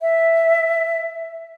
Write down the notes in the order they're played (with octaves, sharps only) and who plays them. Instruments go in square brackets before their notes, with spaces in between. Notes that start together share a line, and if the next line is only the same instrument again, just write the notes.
[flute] E5